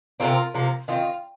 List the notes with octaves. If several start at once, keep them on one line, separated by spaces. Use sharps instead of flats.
C3 F3 C4 F4 A#4
C3 F3 A#3
D#3 C4 F4